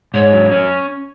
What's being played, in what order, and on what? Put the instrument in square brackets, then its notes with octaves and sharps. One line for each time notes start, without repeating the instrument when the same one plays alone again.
[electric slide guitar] G#2 [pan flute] C#5
[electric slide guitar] F#3
C#4